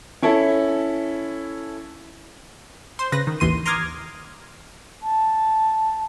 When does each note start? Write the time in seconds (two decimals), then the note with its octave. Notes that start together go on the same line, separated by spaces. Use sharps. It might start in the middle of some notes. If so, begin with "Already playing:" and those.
0.22 C#4 E4 A4
2.99 C5 C6
3.12 C#3 B4 A#6
3.27 D#3
3.40 A1 D#2 E3 C6 D#7
3.66 A#5 C6 D6 D#6 F6 G#6
5.02 A5